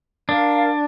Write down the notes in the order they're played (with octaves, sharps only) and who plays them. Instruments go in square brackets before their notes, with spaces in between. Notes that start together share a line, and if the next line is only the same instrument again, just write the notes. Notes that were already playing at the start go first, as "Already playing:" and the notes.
[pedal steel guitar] D4 [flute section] A#4 D5 F5